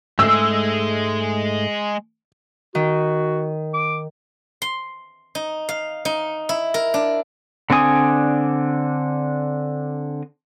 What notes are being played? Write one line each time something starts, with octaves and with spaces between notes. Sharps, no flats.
G#2 G#3 A3 G#4 E6
D#3 F#4
D6
C6
D#4
F5
D#4
E4
A#4
D4
D3 C4 D4 G#5 D#6